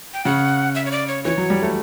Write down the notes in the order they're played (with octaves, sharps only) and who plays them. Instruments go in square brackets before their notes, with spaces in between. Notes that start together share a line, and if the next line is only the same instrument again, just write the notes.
[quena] G5
[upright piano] C#3 [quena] F#5
[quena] E5
C#5
D5
C#5
[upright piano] E3 [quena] C#5
[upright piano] F#3
G3
A3